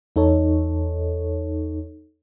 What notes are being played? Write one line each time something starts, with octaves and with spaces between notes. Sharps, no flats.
E2 D#4 A4 C#5